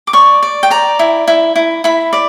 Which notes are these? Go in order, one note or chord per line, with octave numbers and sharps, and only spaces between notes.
D6
D5 C#6
D5
G5
D5 A#5
E4
E4
E4
E4 B5
D5